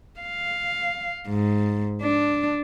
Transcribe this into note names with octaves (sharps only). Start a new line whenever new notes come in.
F5
G#2
D4